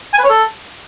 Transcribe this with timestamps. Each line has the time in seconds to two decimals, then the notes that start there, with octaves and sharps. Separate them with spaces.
0.13 G#5
0.19 B4
0.24 C#5
0.30 A4